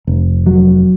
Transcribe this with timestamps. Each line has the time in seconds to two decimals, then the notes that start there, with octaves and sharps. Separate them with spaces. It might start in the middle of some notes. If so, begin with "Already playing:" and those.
0.07 F1
0.46 F#3